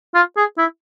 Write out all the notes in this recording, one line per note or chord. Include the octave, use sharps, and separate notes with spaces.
F4
G#4
E4